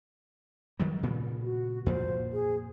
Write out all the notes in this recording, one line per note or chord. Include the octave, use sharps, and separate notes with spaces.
D#3 F#3 G3
A#2 C#3 B3
F#4
F2 A#2 F3 C5
G#4